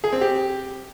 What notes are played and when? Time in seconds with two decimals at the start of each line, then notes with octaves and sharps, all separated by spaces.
0.04 G#4
0.13 C4
0.21 G4